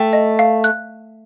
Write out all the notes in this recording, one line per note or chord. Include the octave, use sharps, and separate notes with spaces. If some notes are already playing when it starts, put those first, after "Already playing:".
Already playing: A3 G5
D#5
F5
F#6